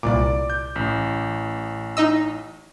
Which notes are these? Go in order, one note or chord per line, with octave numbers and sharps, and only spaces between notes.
C2 A#2 D5 D6
G6
A1
D#4 D#5 E6